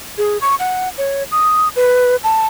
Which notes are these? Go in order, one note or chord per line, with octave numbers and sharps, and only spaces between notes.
G#4
C#6
F#5
C#5
D#6
B4
A5